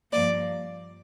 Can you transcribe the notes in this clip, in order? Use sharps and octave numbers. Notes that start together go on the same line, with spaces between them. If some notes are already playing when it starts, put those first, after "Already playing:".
G2 F3 A#3 D5